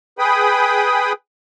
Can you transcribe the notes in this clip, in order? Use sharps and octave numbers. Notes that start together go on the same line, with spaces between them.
G#4 B4 G5 B5 D#6